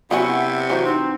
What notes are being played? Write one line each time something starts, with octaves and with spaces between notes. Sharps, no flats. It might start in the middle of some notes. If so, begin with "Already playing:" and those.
C3 F#3 B3 C#4 E4 F#5
E3 F#3 C5
C4 D#4